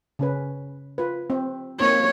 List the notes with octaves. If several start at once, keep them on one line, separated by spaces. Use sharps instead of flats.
C#3 C#4 B4
F4 B4
C4
A#3 C4 D#4 C#5